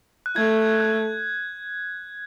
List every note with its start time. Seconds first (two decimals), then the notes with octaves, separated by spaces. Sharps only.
0.26 F#6
0.36 A3 G#6
0.80 F#6